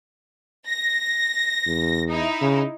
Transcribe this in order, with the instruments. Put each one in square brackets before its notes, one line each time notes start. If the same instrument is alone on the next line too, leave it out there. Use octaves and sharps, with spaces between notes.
[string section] A#6
[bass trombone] E2
[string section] D#4 E4
[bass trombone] C#3